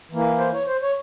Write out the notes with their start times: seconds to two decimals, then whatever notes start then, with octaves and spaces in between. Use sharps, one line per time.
0.11 E3 A#3
0.39 C5
0.53 C#5
0.67 C5
0.82 C#5